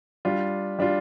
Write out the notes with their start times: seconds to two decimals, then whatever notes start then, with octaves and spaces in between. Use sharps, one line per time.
0.25 G3 D4 F4
0.79 G3 D4 F4